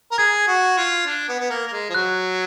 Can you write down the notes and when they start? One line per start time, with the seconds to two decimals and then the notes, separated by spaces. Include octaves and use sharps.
0.11 A#4
0.18 G#4 G#6
0.47 F#4
0.77 F4
1.06 D4
1.29 B3
1.40 B3
1.50 A#3
1.67 A#3
1.73 G#3
1.89 F3
1.94 F#3 F#6